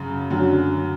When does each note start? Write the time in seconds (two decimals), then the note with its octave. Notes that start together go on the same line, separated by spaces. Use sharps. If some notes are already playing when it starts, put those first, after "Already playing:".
Already playing: F#2 C#3
0.30 F#2 D3 F#3